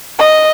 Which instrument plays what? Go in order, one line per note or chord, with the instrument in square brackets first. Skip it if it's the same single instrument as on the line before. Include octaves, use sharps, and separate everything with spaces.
[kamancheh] D#5